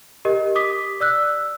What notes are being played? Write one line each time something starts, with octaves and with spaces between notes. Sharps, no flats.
G4 A#4 D#5
D6 D#6 B6
D5 E6 F#6